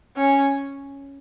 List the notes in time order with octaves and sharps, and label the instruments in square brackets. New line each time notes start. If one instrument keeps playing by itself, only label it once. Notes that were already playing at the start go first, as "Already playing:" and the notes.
[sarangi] C#4